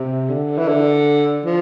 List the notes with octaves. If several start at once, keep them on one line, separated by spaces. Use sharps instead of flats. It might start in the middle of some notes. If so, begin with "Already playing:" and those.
Already playing: C3
D3
E3
D3
F3